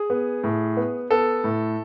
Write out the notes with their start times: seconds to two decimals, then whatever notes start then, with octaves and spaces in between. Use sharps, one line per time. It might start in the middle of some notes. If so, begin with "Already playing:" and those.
Already playing: G#4
0.10 B3
0.44 A2
0.77 B3
1.11 B3 A4
1.44 A2